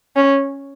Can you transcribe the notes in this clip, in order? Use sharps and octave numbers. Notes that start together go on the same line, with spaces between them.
C#4